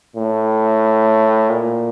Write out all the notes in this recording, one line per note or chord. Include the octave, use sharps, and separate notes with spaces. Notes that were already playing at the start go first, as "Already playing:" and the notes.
A2
A#2